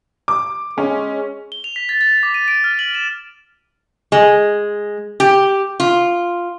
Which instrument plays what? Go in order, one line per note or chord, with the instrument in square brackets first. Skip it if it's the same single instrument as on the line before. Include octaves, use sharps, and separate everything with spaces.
[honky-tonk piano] D6
[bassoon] G#3 [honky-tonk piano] C#4
[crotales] G7
F7
B6
A6
A6
D6
D#7
D7
F6
F#7
E7
[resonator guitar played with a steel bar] G#3
G4
F4